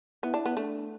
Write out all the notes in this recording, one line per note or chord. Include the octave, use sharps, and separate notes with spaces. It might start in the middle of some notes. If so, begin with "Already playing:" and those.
B3 E4
D4
B3
A3 D4